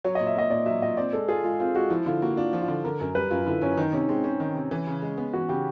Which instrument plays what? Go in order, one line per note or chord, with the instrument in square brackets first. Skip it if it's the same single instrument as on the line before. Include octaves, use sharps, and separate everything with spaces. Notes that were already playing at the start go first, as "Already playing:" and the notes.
[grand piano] F#3 [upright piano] C#5
[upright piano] D#5
[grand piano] A#2
[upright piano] E5
[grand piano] A#3 [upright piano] D#5
[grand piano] A#2 [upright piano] D5
[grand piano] F#3 [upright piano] E5
[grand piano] A#2 [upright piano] D#5
[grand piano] C4 [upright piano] D5
[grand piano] G#3 [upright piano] A4
[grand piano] F4 [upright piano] G#4
[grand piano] G#3 [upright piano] F4
[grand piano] C4 [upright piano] F4
[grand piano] G#3 [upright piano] F#4
[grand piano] F3 [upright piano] E4
[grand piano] D3 [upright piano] F4
[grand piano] A#3 [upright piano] F#4
[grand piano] D4 [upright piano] F4
[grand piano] F3
[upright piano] F4
[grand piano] D3
[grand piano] D3 [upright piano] A#4
[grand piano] F#2 [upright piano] A#4
[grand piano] G3 [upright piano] B4
[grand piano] F#2 [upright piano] F4
[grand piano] D3 [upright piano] E4
[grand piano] F#2 [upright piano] C#4
[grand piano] D#3 [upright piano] D#4
[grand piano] C3 [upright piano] C#4
[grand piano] G#3 [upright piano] C4
[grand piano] C4 [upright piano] C#4
[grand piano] D#3
C3
E3
C#3
G#3
B3
[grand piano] E3 [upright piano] F#4
[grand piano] C#3 [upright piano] G4